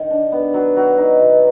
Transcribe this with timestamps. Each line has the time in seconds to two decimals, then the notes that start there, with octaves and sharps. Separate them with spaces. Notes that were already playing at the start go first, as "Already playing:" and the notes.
Already playing: D#3
0.11 D4
0.32 B3
0.54 F#3
0.76 F#3
0.98 D#4
1.20 B2